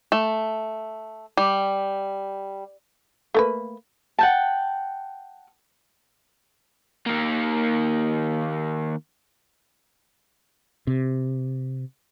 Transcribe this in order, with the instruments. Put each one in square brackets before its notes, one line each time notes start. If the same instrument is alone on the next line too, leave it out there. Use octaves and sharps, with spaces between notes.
[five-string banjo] A3
G3
[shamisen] A3 A#3 B4
[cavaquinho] F#5 G5 A5
[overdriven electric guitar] D#3 A#3
[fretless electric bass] C3